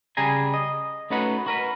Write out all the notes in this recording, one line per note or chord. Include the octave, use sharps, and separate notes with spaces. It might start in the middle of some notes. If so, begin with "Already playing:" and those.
C#3 G3 G#4 G#5 A#5
D#5
A3 C#4 D#4 F#4 B4 F#5
F#4 A#4 B4